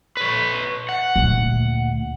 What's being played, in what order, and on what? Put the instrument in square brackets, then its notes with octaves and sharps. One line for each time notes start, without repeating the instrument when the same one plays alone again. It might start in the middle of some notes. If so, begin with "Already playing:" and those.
[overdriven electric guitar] B4 C#5
F#5
[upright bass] D2 A#2